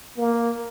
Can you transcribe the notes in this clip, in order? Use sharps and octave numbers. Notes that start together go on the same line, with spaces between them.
A#3